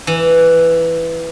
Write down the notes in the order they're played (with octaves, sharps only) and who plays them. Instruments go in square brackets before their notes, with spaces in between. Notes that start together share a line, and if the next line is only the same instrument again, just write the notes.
[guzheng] E3